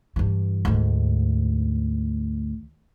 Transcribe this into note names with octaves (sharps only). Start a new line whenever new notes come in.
G2 E3
D2 G#2